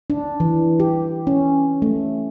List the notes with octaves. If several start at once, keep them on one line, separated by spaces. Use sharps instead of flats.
D4
E3
G4
C#4
A3